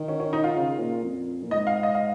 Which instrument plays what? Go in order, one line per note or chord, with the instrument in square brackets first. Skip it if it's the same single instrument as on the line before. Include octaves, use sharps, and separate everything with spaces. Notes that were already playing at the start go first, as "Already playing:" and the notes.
Already playing: [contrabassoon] D#3
[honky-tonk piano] C#4
C#4
D#4
F4
[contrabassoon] C#3
A#2
F2
A#2
[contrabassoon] G#2 [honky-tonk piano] D#5
[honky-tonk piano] F5
D#5
F5